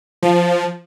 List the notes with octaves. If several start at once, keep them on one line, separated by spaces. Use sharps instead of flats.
F3